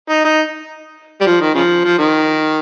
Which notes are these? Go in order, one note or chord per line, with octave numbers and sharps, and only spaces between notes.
D#4
D#4
G3
F3
D#3
C#3 F3
F3
D#3